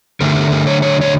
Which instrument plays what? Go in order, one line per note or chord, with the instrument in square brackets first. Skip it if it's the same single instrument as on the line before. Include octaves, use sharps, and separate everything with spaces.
[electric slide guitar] D3 A3 D4 A#4
A#4
A#4
C#5
C#5
C#5